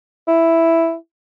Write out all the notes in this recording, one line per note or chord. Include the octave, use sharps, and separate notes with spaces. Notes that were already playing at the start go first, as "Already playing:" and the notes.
E4